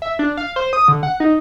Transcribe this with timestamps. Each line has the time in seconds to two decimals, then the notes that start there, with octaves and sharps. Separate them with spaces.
0.02 E5
0.19 D4
0.37 F5
0.56 C5
0.73 D#6
0.88 D3
1.03 F#5
1.20 D#4